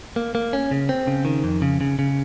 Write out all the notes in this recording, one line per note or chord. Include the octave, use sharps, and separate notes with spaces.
A#3
A#3
C#4
C#3
C4
C#3
D#3
F2
C#3
C#3
C#3